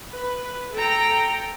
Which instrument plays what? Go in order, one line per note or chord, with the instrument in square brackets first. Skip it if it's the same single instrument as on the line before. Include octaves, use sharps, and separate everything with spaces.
[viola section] B4
A4 G5 A#5